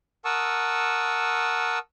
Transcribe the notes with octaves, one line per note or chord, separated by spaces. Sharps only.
A#4 F#5 A5 C#6 D#6 E6